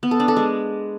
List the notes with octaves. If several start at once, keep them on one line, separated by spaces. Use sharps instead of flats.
B3
A4
D4
A4
G#3